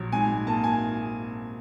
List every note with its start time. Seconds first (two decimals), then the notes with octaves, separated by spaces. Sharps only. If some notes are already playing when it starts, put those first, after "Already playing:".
Already playing: A#1 F#3
0.12 G#2 G#5
0.47 A#3 A5
0.64 G#5